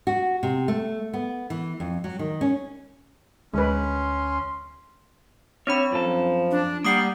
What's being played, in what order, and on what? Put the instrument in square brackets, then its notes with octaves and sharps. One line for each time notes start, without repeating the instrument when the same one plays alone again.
[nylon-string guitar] F#4
C3
A3
B3
E3
F2
F#3
D#3
C#4
[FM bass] D2 [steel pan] G#3 B4 [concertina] C#4 [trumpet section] C6
[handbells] C4 D4 B5 [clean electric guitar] C#5
[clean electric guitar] F#2 A4 [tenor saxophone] F3
[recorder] D4
[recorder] G3 [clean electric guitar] A#3 F#5 [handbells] D6 D#6 C7